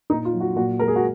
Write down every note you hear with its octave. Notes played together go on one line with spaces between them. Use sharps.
A#2 D#4
F4
F#3
F#4
A#2 F#4
G#3 A#4
G#4
F#4